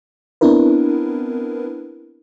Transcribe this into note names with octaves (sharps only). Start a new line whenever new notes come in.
B3 C4 D4 E4 A#4 B4